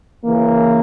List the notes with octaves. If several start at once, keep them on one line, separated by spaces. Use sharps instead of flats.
C#3 E3 A#3